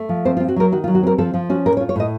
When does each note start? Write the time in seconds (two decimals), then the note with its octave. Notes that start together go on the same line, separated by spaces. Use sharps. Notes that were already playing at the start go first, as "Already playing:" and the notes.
Already playing: A3
0.09 F3
0.25 C4 C5
0.37 F4
0.40 C4
0.48 F#4
0.56 F#3 A#4
0.72 D#3 F#4
0.84 F4
0.87 F#3
0.95 F#4
1.03 C4 A#4
1.18 F3 A4
1.33 F3 F4
1.50 C#4 F#4
1.66 A2 A#4
1.77 C#5
1.80 F4
1.89 C#5
1.96 A2 D#5